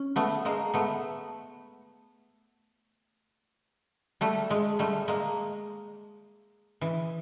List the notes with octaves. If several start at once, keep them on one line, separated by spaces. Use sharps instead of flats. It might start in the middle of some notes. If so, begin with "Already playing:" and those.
Already playing: C#4
A3 B3
G#3 A#3
A3 B3
G3 A3
G#3
G3 A3
G#3 A#3
E3